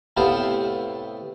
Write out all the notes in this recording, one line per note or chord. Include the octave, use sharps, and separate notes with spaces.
A2 C3 B3 C5 F5 A5